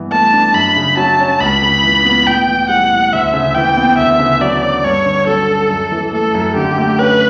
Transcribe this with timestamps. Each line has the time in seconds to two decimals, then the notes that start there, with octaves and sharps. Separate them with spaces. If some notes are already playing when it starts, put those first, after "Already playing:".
Already playing: G2 E3 B3
0.12 A3 A5
0.33 D4
0.54 F#2 B5
0.76 C#3
0.97 F#3 A5
1.20 C#4
1.40 C#2 B5
1.62 C#3
1.83 E3
2.05 B3
2.26 A2 G5
2.48 E3
2.69 G3 F#5
2.91 A2
3.13 D2 E5
3.34 C#3
3.55 E3 G5
3.77 B3
3.98 D2 E5
4.20 C#3
4.41 F#3 D5
4.63 C#4
4.84 G2 C#5
5.06 D3
5.27 F#3 A4
5.49 C#4
5.70 F#2
5.92 E3
6.12 A3 A4
6.34 F#2
6.56 D3 G4
6.78 A3
6.99 C#4 B4